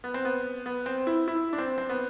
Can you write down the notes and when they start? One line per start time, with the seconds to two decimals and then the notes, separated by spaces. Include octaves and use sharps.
0.04 B3
0.14 C4
0.25 B3
0.66 B3
0.86 C4
1.07 E4
1.28 E4
1.53 D4
1.58 C4
1.78 C4
1.89 B3